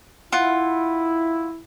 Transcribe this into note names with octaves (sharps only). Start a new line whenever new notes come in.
E4 F4 F#5